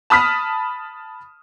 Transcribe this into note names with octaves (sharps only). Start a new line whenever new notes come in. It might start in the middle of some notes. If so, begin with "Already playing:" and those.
A5 B5 D#6 F6 B6